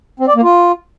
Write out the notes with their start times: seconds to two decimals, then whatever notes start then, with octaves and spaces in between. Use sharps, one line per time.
0.20 C4
0.28 D5
0.36 A#3
0.44 F4